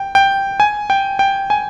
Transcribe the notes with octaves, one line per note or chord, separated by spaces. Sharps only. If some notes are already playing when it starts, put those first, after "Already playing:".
Already playing: G5
G5
G#5
G5
G5
G#5